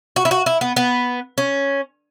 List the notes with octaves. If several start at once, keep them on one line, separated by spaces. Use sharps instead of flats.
F#4
E4
F#4
E4
B3
B3
C#4